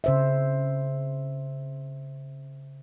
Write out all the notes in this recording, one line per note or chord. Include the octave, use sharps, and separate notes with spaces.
C#3 C5 E5